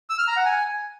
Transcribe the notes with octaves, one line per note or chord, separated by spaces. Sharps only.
E6
F6
A#5
F#5
G#5